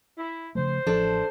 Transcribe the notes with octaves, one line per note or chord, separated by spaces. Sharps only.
E4
C#3 F3 A3 C5
A1 F3 D4 A4